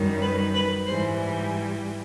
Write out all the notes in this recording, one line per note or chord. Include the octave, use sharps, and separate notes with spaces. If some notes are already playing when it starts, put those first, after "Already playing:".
Already playing: F#2 D#3 G3
B4
B4
G#2 E3 G3 C5